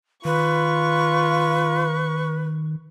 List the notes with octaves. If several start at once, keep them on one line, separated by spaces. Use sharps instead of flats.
D#3 F4 B4 C#6